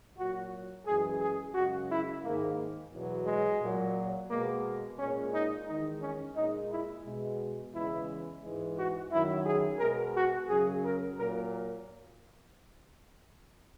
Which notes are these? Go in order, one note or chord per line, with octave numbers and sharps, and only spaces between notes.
A#2 F#3 F#4
F#2 E3 G#3 G#4
G#4
F#2 C#3 G#3 F#4
E4
G#2 D#3 G#3 A#3
E2 B2 F#3
G#3
A#2 F#3
B2 G#3 A#3
A#2 G#3 C#4
D#4
E2 D#3 G#3 D#4
C#4
A#2 G#3 D#4
E4
B2 G#3
E2 C#3 E3 G#3 E4
G#2 E3 G#3
F#4
F#2 D#3 F#3 E4
G#4
B2 G#3 A#4
F#4
F#2 C#3 F#3 G#4
A#4
A#2 F#3 A#4